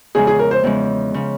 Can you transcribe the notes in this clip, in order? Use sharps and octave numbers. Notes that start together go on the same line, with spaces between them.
E2 C#3 F3 G#3 G#4
G#4
A#4
C5
E2 C#3 F3 G#3
C#3 F3